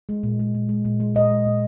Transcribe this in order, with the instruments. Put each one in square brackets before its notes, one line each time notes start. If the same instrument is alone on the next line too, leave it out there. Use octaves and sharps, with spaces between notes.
[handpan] G#3
A#2
G#3
A#2
G#3
A#2
G#3
A#2 D#5
G#3
A#2